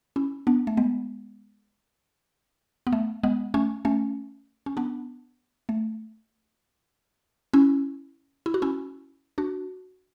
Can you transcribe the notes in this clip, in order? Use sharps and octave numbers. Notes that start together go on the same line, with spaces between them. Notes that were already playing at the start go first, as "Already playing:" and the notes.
C#4 E4
B3 D4
A3
G#3 B3
B3
A3
G#3 B3
A3 C#4
A3 C#4
C#4
B3 D4
A3
C#4 E4
E4
F#4
C#4 E4
D4 F#4